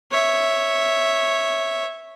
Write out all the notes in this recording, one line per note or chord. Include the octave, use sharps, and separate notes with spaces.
C#5 E5